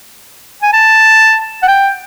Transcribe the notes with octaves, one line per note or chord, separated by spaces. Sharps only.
G#5
A5
F#5
G5